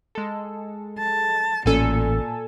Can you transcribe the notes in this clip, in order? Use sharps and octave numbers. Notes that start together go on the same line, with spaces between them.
G#3 A4
A5
A1 A#2 C#4 A4 G#5